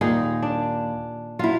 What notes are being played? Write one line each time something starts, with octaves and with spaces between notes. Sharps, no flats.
D#2 A#2 D#4 G#4
D4
F#3 E4 F4